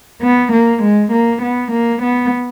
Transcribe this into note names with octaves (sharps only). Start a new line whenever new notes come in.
B3
A#3
G#3
A#3
B3
A#3
B3